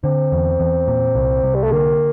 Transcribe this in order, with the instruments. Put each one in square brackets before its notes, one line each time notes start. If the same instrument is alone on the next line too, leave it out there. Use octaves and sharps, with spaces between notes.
[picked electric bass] D3 [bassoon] C4
[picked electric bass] E2
E2
A#2
C2
C2
[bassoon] G3
A3
[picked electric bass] D3 [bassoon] A#3